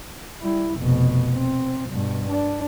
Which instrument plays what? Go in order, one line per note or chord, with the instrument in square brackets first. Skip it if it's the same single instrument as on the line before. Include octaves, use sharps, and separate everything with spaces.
[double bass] G3 E4
F1 B2
C4
G2 B2
D4